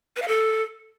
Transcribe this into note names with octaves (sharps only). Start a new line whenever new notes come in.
B4
F5
A4